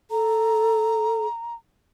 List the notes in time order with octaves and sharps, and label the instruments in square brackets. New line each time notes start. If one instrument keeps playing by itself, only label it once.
[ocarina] A4 [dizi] A#5